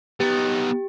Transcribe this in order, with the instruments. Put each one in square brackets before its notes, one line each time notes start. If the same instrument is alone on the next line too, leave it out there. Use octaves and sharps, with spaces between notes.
[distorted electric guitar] B3 D#4 [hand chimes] G4